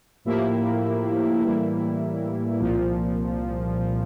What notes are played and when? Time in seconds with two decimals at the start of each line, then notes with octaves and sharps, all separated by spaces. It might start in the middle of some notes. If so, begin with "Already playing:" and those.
0.25 A2 F3 A#3 E4 G4
1.42 A2 E3 G3 A#3 E4
2.60 C2 A#2 F3